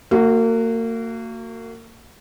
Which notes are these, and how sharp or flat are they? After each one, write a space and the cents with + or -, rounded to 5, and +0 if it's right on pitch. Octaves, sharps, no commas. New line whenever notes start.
A#3 -35 F#4 +0